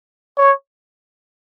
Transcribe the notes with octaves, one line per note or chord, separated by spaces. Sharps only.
C#5